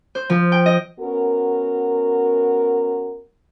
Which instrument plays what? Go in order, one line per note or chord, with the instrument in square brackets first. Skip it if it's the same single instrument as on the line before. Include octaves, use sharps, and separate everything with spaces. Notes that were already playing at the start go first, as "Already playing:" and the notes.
[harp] C5
F3
G5
D#5
[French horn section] B3 C#4 F#4 A#4